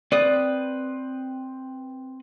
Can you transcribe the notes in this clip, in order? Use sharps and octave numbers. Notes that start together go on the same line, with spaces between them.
C4 B4 D5 D#6